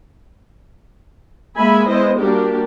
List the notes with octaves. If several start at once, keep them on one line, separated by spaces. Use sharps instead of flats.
G#3 A#3 E5 G#5 B5
G#3 B3 E4 C5 D#5
G3 A#3 D4 F#4 G4 A#4